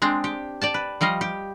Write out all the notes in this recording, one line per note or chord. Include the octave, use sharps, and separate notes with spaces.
G#3 C4 D4
G4
D5 G5 A5
B4
F3 G3 D#5 F5
G4